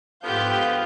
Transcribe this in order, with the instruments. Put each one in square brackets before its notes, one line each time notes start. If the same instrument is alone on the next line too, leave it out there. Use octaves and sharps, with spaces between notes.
[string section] G#2 G4 G6 [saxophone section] D3 F3 F4 [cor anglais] B3 [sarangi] F5